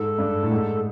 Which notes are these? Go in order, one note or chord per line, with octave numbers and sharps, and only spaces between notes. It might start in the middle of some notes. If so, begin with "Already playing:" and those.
Already playing: G#2 A4
G2
A2
G#2